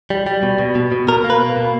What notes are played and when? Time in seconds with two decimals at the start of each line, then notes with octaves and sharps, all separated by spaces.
0.10 G3
0.26 G3
0.43 B2
0.59 B2
0.75 B2
0.92 B2
1.08 B2 A#4
1.24 A#3
1.30 B4
1.40 A#3
1.57 B2